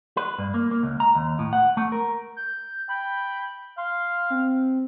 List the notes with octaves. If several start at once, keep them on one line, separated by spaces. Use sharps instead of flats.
B4
G2
A#3
A#3
C#2
A#5
D#2
A2
F#5
A3
A#4
G6
G5 B5
F5 C6
C4